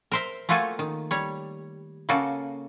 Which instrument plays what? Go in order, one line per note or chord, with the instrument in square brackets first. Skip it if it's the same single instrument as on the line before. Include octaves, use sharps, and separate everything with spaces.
[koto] A#4 C5 E5
A3 A#3 F4 F#4 A4 G#5
D#3
G3 C#5
C#3 A#3 F#4 A4